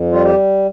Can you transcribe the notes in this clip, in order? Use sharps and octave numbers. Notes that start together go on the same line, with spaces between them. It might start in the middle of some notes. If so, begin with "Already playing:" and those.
Already playing: F2
G3 F4
G4